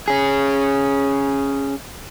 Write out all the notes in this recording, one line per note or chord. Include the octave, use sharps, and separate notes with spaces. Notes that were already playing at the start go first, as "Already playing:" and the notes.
C#4 G#4